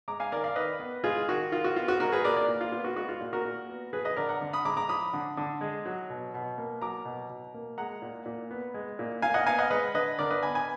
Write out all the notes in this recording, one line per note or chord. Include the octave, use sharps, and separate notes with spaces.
G#3 A#5 D6
F5 G#5
D#3 A#4 D5
D5 F5
D#3 B4 D#5
B3
G#3 F4 G#4
D#3 F#4
D#3 F4
F#4
B3 F4
F#4
G#3 F#4 A#4
G#4 B4
A#2 A#4 D5
A#4 D5
A#2
F4
B3 F4
F#4
G#3 F#4
F4
A#2
F#4 A#4
A#2
B3
F3 G#4 B4
B4 D#5
D3 A#4 D5
F#5 A#5
D3
B5 D#6
G#3 A#5 D6
A#5 D6
F3 B5 D#6
D3
D3
G#3
F#3
B2
B2
A#3
F#3 A#5 D6
B2
B2
A#3
G#3 F#5 A#5
A#2
A#2
B3
G#3
A#2
A#2 F5 G#5
D#5 F#5
B3 F5 G#5
D#5 F#5
G#3 B4 D#5
D3 B4 D#5
D3 A#4 D5
B4 D#5
B3 G#5 B5
G#5 B5